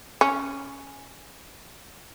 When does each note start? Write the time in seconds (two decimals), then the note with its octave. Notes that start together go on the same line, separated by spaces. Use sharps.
0.21 C#4